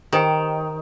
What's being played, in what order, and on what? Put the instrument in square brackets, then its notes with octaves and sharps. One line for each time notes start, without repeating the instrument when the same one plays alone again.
[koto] D#3 [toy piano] G4 C5 D#5 G5